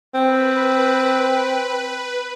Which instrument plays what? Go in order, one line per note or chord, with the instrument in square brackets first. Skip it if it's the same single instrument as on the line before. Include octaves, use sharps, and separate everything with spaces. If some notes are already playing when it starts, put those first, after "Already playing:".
[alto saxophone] C4 [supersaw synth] B4